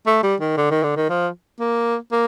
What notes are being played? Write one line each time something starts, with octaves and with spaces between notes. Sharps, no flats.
A3
G3
D#3
D3
D#3
D3
D#3
F3
A#3
A#3